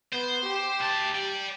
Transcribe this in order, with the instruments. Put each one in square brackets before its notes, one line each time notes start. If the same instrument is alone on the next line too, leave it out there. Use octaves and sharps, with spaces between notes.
[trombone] B3 [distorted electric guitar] C5
[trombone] G4
[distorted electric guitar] D2 A5
D5 G5